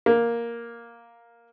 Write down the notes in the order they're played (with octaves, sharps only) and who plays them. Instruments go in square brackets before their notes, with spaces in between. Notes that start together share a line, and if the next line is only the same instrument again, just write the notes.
[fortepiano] A#3